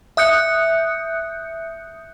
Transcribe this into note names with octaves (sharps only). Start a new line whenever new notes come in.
E5 D#6 F#6 G6 C#7